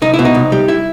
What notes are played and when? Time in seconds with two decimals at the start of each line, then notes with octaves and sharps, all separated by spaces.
0.02 C2 D#4
0.14 E4
0.19 B2
0.25 D#4
0.35 C2
0.52 G3
0.68 E4